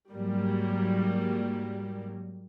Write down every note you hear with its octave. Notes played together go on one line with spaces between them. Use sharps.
G#2 F#3 G3 A#3